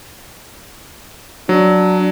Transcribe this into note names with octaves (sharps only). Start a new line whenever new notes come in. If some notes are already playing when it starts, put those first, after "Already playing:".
F#3 D4